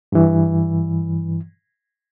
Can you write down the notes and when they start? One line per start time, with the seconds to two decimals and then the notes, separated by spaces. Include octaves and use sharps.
0.12 G2 E3